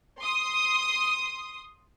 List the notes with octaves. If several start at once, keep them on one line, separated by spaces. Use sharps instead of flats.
C6 D#6